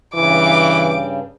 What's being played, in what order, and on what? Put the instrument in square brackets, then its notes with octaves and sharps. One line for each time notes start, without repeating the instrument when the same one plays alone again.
[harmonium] G2 C#3 [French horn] E3 [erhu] D6